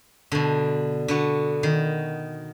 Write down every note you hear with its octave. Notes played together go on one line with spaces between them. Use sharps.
B2 D3
D3 B3 F#4
D#3